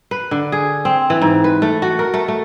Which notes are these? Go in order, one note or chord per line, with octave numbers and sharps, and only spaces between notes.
B4
D3
G#4
C4
E3
G#2
B4
A3
F#4
A#4
A3
A3